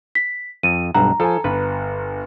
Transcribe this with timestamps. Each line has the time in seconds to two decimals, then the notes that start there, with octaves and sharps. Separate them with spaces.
0.15 B6
0.63 F2 D#7
0.94 B1 G2 F#5 A#5
1.20 F3 A4 G#5
1.44 G1 B4